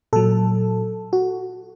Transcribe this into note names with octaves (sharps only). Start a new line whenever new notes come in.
A#2 F#3 A4
F#4